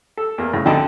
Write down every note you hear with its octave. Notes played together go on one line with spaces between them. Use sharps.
A4
E2 A#3 A#4
A2 C#3
D2 D3 C4 D#4 G5 A5